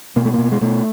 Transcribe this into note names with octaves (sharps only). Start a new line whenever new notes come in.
B2 A#3
A3
B2 A#3
G#3
B2 A3